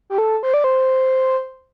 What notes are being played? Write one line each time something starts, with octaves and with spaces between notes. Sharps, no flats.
G4
A4
C5
D5
C5